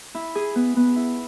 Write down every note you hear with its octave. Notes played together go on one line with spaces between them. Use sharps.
E4
G#4
B3
B3
E4